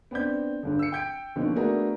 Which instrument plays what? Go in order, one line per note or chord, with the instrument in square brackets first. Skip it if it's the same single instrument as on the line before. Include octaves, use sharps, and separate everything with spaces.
[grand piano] B3 C4 D4 G6
G1 G2 D3
E6 C#7
G5 G6 D7
B2 D3 D#3 F3 A#3 C#4
A3 B3 D4 F#4 G#4 A#4